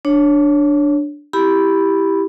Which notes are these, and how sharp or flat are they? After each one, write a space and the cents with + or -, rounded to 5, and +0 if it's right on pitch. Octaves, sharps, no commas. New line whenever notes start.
D4 +0 C#5 +0
E4 +0 G4 +0 B5 +0